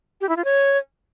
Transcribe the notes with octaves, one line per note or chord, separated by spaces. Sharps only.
G4
E4
F4
C#5